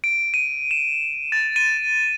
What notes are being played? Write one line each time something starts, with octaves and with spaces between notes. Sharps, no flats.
D7
D#7
E7
A6
D#7